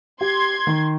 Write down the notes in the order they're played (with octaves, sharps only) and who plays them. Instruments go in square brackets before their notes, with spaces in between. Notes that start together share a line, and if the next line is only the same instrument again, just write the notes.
[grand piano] G4 [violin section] C6 G#6
[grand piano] D#3